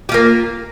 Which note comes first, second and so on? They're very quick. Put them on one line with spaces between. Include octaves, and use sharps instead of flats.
G4 F4 A#3